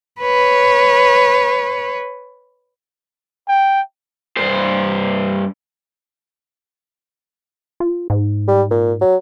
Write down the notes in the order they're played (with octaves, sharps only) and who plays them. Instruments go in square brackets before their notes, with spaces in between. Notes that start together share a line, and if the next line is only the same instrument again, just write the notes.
[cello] B4 C#5
[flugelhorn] G5
[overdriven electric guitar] G2 C5
[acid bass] F4
G#2
[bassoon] G3
A#2
F#3